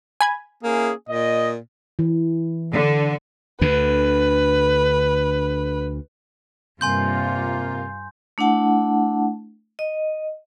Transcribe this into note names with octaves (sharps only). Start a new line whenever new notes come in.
G#5 B5 G#6
A#3 C#4 E4 G#4
A#2 D#5
E3
D3
D2 D3 B4
G2 C3 A#3 F4 G#5 C6 G6
A3 D4 E4 F#5 A5
D#5